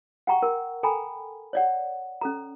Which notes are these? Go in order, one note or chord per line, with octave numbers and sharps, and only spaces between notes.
F#5 G5 A#5 C#6
A#4
A4 G5 G#5 A#5 B5
C#5 D5 F#5
C#4 A4 A#5